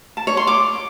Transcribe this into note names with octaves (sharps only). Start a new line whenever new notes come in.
A5
C#5
C6
D6